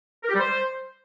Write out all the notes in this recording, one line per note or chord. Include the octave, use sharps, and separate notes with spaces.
A#4
G4
G3
C5